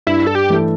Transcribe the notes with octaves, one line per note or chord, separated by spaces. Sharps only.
G2 E4
A4
G4
E3 A3 E4 A4